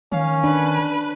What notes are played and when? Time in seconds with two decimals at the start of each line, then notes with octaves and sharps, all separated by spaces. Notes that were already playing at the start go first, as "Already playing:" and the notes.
0.12 D#3 C#4 F5
0.44 D4 B4